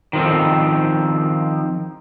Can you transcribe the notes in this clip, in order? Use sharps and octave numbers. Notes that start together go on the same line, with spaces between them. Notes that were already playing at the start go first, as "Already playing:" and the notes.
D#3 F3 C4